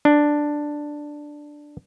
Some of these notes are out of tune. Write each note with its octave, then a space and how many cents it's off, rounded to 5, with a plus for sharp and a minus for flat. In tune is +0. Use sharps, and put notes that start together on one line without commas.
D4 +5